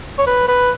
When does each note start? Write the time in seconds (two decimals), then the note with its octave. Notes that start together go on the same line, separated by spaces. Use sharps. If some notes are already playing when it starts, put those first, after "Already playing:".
0.19 C#5
0.27 B4
0.48 B4